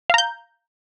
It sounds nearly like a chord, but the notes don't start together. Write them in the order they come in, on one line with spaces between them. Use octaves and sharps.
F5 A#5 G6